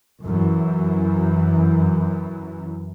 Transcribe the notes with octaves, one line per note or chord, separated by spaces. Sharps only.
F#2 E3